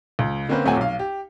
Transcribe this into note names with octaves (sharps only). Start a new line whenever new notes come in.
C#2
D3 A#3 C4 C#4 B4 C5
D#1 A3 C4 C#5 F#5 G#5
B1 F5
G4